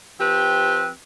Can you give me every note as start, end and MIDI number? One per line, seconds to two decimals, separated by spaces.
0.21 0.90 53
0.21 0.90 60
0.21 0.90 67
0.21 0.90 71